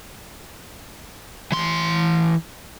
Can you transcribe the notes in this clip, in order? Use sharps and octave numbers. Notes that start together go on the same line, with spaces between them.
E3 C6